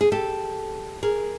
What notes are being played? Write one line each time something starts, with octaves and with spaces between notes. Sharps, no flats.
G#4
G4 A4
G#4 A#4